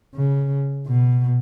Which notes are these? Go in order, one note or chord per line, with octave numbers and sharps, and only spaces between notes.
C#3
B2